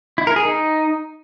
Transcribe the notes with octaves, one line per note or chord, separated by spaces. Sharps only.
E4
A#4
G#4
D#4